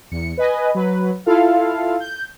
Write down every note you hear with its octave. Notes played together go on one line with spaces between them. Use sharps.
E2 C#7
B4 D#5 G#5
F#3 B4
E4 F4 A4 F5
G6